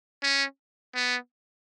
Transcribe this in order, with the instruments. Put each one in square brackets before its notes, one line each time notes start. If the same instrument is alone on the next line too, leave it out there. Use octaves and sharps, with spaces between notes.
[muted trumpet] C#4
B3